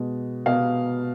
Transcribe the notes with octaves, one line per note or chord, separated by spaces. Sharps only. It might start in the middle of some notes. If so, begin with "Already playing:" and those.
Already playing: B2 G#3
B2 F5